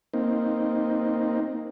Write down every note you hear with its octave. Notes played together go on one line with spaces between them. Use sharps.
A#3 C4 D#4